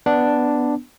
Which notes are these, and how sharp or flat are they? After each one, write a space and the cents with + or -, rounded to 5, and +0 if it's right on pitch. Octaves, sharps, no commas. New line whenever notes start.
B3 +0 D4 +0